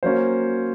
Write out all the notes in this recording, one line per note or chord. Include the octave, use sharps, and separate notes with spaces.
F#3 A#3 C#4 C5